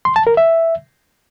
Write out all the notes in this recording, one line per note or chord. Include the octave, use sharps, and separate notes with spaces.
C6
A5
A#4
E5